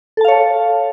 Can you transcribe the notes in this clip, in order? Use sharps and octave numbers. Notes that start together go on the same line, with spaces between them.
A4 C#5 F5 A5